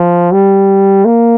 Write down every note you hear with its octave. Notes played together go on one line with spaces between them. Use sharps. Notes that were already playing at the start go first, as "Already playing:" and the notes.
Already playing: F3
G3
A#3